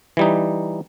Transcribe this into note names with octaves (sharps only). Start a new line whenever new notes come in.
E3 G3 D#4